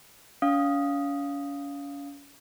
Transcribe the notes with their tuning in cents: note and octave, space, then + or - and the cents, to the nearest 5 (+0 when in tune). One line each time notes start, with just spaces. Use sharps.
C#4 +40 F5 +0 D#6 +0